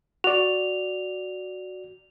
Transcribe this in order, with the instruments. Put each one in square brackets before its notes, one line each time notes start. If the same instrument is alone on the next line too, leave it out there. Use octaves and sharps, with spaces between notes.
[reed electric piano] F#4 D5 [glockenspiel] F7